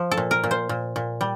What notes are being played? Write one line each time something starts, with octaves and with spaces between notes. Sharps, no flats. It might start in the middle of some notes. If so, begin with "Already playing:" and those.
Already playing: F3
A4
A#2
A#4
A#2
C5
A#2
A#2
G3